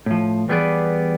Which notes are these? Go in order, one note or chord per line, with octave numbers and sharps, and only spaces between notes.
A2 F3
E3 G3 B3 G#4 B4 D5